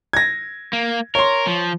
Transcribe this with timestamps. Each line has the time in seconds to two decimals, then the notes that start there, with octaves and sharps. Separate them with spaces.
0.13 G#6 A#6
0.73 A#3
1.15 A#4 C#5 C6
1.47 F3